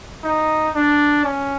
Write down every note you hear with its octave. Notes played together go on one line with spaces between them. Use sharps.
D#4
D4
C#4